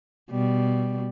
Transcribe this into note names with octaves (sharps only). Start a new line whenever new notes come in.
B2 G3